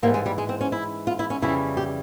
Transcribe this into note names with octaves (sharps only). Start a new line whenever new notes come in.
G#2 E3 G3 A#3
G#3
G3
G#3
C4
C#4
E4
F4
E4
C#4
F2 C#3 E3 G3 E4
G4